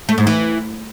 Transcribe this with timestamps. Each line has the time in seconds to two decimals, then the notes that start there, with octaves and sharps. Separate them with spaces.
0.09 A3
0.18 G#2
0.27 E3